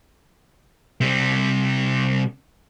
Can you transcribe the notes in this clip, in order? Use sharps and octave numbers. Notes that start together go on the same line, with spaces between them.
C3 G3